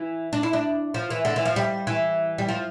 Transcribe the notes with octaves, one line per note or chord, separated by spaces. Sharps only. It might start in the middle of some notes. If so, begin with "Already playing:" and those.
Already playing: E3
D4
E4
D4
F3
E3
D3
E3
F3
G3
E3
G3
F3